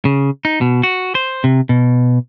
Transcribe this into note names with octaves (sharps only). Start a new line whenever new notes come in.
C#3
D#4
B2
F#4
C5
C3
B2